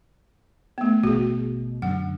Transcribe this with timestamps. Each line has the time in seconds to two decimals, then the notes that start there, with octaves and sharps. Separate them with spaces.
0.78 A3 B3
1.03 G#1 B2 F#4 G#4
1.82 F#2 D3 F#5